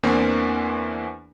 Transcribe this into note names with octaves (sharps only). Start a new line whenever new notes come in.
E2 E3 A#3 C4 D4